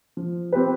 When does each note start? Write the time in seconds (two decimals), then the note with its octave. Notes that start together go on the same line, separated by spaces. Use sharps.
0.17 F3
0.53 C4 G4 B4